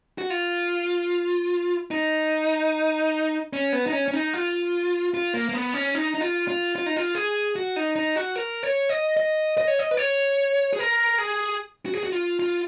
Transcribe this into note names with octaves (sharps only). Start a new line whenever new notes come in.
F#4
F4
D#4
C#4
B3
D#4
C#4
C#4
D#4
F4
F4
A#3
A#3
B3
C#4
D#4
D#4
F4
F4
F4
D#4
F4
G#4
F#4
D#4
D#4
F#4
A#4
C#5
D#5
D#5
D#5
C#5
D#5
B4
C#5
G#4
A#4
G#4
F#4
G#4
F#4
F4
F4